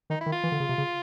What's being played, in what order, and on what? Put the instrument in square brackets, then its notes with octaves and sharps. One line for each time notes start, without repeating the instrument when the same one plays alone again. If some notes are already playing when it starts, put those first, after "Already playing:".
[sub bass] D#3 [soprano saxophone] D#4
[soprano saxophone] E4
[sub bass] D#3
[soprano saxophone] F4
[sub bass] E3
D3
C#3
C3
C#3